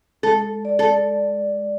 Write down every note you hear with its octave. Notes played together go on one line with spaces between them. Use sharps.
G#3 A4
D5
A4